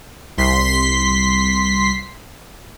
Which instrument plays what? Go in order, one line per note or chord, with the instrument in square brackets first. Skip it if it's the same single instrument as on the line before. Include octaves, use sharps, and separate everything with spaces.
[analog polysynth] C2 C6 B6 C7